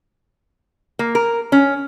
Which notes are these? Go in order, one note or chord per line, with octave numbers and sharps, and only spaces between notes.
A#3
A#4
C#4